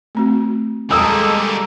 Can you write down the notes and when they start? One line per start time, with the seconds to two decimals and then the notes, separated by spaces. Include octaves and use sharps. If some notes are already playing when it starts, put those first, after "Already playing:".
0.15 A3 C4 F#4
0.91 G3 G#3 A#3 A4 A#5 D#6 E6